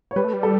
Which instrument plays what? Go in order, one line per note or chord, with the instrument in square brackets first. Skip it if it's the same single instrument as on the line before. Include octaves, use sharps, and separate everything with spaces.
[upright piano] C#5
[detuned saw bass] G3 [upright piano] B4
[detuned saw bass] A3
G3
[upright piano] A4